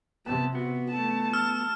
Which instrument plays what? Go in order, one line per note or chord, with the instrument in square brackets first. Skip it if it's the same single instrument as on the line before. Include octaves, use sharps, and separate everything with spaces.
[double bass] C3 [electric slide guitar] B3 [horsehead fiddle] A5
[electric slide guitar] B3 [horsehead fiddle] F#4
[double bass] A3 [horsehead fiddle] A5
[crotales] E6 F6